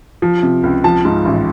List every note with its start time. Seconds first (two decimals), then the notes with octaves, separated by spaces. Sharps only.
0.22 F3
0.43 C3
0.63 C#2
0.84 F3 A5
1.05 G#2
1.25 A1